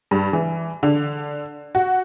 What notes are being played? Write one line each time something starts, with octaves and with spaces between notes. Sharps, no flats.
G2
E3
D3
F#4